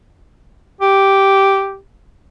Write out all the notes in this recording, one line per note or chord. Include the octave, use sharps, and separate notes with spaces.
G4